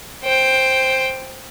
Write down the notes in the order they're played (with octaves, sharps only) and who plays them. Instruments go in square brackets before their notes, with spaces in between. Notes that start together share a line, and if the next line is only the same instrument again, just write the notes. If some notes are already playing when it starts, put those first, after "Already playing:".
[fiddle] C5 G5